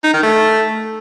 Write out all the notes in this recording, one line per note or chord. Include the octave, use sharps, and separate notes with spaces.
D#4
D#3
A3